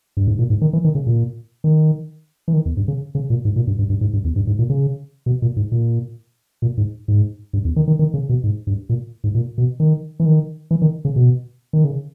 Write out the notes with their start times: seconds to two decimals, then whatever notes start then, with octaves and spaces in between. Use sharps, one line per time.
0.17 G2
0.28 G#2
0.39 A#2
0.50 G#2
0.62 D#3
0.73 E3
0.85 D#3
0.95 C#3
1.07 A#2
1.64 D#3
2.48 E3
2.54 D#3
2.66 E2
2.77 G2
2.88 C#3
3.15 C#3
3.30 A#2
3.45 G#2
3.56 A#2
3.67 G2
3.79 G2
3.90 G2
4.01 G#2
4.13 G2
4.24 E2
4.36 G2
4.47 G#2
4.59 A#2
4.70 C#3
5.26 B2
5.42 A#2
5.56 G#2
5.72 A#2
6.62 A#2
6.77 G#2
7.08 G#2
7.53 G2
7.65 E2
7.76 D#3
7.88 D#3
7.99 D#3
8.14 C#3
8.29 B2
8.44 G#2
8.67 G2
8.89 A#2
9.24 G#2
9.35 A#2
9.58 B2
9.80 D#3
10.20 E3
10.26 D#3
10.71 E3
10.82 D#3
11.05 C#3
11.16 B2
11.73 D#3
11.84 C#3